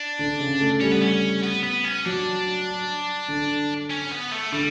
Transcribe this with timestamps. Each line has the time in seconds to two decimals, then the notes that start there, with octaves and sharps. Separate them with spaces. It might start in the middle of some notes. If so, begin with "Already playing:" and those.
Already playing: D4
0.19 D3
0.40 C#3
0.61 A3
0.81 G3 C#4
0.92 B3
1.03 C#4
1.44 B3
1.64 B3
1.84 C#4
2.06 F#3 D4
3.28 D3
3.91 C#4
4.12 B3
4.32 A3
4.52 D3 G3